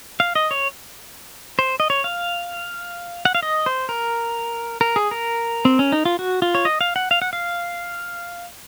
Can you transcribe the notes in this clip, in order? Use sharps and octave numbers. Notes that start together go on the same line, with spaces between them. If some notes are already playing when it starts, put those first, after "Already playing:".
F5
D#5
C#5
C5
D#5
C#5
F5
F#5
F5
D#5
C5
A#4
A#4
G#4
A#4
C4
C#4
D#4
F4
F#4
F4
C#5
D#5
F5
F#5
F5
F#5
F5